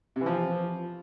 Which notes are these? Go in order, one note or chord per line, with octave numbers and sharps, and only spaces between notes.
C3
E3
F3